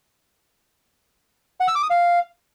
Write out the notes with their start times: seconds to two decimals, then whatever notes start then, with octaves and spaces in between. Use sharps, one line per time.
1.60 F#5
1.68 E6
1.75 D6
1.83 D#6
1.90 F5